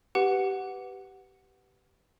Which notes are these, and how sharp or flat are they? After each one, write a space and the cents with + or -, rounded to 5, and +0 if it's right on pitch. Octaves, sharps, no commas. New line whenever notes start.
G4 -15 B4 +5 F#5 +0